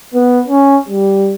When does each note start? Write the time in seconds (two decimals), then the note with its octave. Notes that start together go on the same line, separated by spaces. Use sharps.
0.14 B3
0.48 C#4
0.89 G3